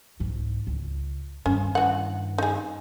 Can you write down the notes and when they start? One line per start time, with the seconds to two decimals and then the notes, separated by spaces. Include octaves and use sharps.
0.20 C2 G#2
0.67 C#2
1.46 G2 D#3 C#4
1.75 E3 F#5
2.38 D#4 G#4